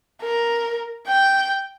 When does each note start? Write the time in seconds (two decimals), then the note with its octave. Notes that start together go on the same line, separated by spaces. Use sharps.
0.22 A#4
1.07 G5